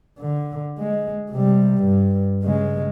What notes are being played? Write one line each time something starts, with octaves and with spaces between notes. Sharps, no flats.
D3
G#3
C3 G3
G2
C#3 G#3